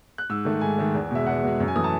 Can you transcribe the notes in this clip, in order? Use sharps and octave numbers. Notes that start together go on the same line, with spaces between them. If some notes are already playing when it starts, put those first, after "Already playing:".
F#6
G#2 E6
D#3 A3
G#2 G#5
D#3 A3
E2
B2 G#3 E5
E2 F#5
B2 G#3
F#2
G#5
E3 A3 D#6
A5